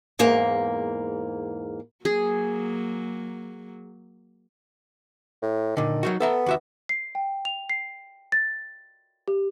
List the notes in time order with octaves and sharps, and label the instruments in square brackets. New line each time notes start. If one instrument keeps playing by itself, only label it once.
[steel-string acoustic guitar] E2 G#2 A#3
[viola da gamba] F#3 A#3 [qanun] G#4
[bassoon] A2
[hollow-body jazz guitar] A#2 D3 [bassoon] D#3
[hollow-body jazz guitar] F#3 D#4 F#4
[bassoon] B3 [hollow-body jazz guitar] A4 E5 A#5
[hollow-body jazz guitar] D#2 F#4 E5
[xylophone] C7
G5
F7
C7
A6
G4